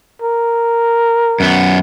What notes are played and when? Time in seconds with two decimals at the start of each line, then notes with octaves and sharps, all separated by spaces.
0.22 A#4
1.40 F#2 B3